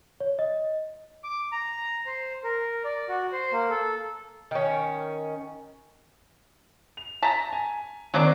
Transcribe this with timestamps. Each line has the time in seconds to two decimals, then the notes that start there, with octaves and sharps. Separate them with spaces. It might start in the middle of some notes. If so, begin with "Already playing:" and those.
0.20 C#5
0.39 D#5
1.24 D6
1.52 A#5
2.06 C5
2.44 A#4
2.84 D5
3.09 F#4
3.33 C5
3.53 A#3
3.70 A4
4.51 D#3 C#4
6.97 F7
7.22 A5 A#5 B6
7.53 G#5
8.14 D#3 F#3 A#3 C4 D4